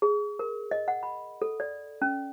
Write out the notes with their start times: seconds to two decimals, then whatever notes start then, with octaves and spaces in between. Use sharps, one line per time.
0.02 G#4
0.39 A#4
0.71 D#5
0.88 F#5
1.03 B5
1.42 A4
1.60 D5
2.02 C#4